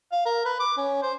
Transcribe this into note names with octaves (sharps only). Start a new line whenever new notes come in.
F5
A#4
B4
D6
C#4
C5